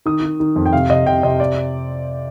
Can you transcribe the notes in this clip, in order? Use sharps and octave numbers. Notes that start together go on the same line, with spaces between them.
D#3 D#6
D#3
D#3
F2
G5
C3 F5
C3 D#5
C3 G5
C3 D#5
D5